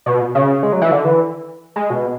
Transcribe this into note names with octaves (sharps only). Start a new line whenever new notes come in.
B2
C#3
G#3
F#3
E3
D3
E3
G#3
B2